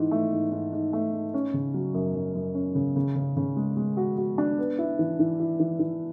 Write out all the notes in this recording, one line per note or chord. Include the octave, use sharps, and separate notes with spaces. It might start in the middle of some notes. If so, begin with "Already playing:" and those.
Already playing: G#2 E3
A3
G#2
G#2
G#2
A3
G#2
C#4
C#3
F#3
F#2
F#2
F#2
C#4
C#3
C#3
C#3
C#3
G#3
G#3
F#4
F#4
D4
B3
E4
E3
E3
E4
E3
E3